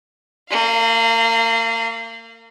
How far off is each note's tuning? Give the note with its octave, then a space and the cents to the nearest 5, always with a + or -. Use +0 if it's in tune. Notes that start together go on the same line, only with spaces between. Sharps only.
A#3 -35 F5 +0